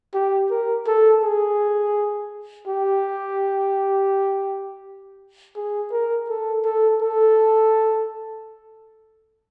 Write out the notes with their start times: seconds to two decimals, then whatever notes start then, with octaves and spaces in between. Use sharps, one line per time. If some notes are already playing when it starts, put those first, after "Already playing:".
0.14 G4
0.51 A#4
0.87 A4
1.23 G#4
2.68 G4
5.56 G#4
5.92 A#4
6.29 A4
6.65 A4
7.01 A4